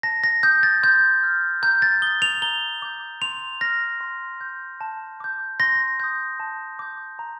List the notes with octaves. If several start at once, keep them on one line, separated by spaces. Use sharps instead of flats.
A5 A#6
A#6
D#6 G6
A6
C6 G6
F6
A#5 G6
A6
D#6 G6 G7
F7
A#5 G7
D6 G6
C6 F7
F6 A#6
C6
G6
A5
D6 G6
C6 A#6
D#6 G6
A5
D6 G6
A#5